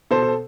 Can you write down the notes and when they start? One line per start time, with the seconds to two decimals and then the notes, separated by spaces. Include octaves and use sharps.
0.11 B2 A4 C5
0.22 A4